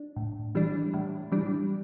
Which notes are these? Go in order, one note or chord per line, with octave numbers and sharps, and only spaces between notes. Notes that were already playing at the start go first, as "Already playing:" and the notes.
Already playing: D4
A2
E3 G3 D4
A2
E3 G3 D4